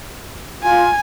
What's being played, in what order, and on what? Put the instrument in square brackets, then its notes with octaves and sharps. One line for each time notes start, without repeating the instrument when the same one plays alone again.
[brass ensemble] F4 [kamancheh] G#5